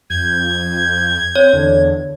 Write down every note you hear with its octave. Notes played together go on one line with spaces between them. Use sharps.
F2 G6 G#6
C4 C#5
E2 D3